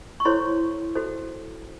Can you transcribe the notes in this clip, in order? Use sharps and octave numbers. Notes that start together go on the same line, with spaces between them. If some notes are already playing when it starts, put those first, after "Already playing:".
C#6
E4 A4 C5 C#5 C6
F#4 A4 C5